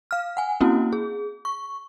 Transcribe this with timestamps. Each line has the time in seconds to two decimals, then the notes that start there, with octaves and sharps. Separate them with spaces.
0.11 F5 F6
0.37 F#5 G#5
0.61 A#3 C4 C#4 E4 F#4
0.93 G#4
1.45 C#6